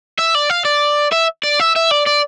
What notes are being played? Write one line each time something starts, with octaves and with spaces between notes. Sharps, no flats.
E5
D5
F5
D5
E5
D5
E5
E5
D5
D5